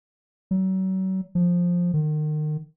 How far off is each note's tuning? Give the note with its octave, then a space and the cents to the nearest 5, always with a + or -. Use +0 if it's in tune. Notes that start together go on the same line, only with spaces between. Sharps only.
F#3 +35
F3 +10
D#3 -35